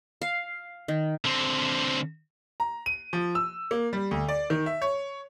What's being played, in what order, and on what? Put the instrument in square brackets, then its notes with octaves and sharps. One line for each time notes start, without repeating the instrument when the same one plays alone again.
[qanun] F5
D#3
[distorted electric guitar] D3 C4
[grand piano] A#5
D#7
F3
E6
A#3
G3
D2
D5
D#3
E5
C#5